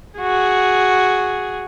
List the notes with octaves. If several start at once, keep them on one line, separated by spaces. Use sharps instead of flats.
F#4 G#4